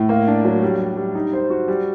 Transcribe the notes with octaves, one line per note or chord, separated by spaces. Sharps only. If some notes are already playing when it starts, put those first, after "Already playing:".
Already playing: A2
A#3
D4
F#3
G3
G3
G3
D#4
C5
F#4
G3